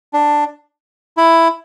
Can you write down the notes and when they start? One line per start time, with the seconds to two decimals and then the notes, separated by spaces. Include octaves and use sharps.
0.13 D4
1.17 E4